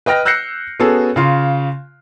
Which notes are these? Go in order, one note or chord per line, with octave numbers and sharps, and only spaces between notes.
B4 D#5 G5 F6 A#6
E6 F#6 G6 A#6 C7 C#7
B3 C#4 F#4 G#4 A4
C#3 F4 F5 C6